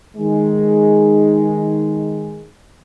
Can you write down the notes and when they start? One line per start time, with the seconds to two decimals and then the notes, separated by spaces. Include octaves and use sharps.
0.17 D#3 G#3